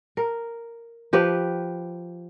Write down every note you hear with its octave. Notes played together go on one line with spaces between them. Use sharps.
A#4
F3 G4 B4